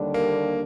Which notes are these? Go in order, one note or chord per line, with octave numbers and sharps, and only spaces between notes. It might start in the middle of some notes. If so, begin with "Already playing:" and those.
Already playing: D#2 D3 G3 D4
A#3